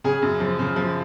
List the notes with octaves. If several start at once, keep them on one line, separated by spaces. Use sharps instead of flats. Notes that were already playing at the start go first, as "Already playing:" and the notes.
C#3 G#4
F#2
F3
C#3
F3